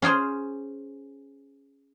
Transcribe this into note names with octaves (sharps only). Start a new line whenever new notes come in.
C#4 F4 G#4 C5